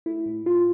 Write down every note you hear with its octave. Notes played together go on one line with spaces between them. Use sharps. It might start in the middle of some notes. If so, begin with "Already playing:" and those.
A3 E4
A2
A2 F4